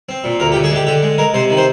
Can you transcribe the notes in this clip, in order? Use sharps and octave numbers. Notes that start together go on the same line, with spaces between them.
C4
A#2
D2 A#4
G4
D3
G#4
G#3 G4
D3 G4
G#3
G#3 A#4
C3 C5
D#3
C5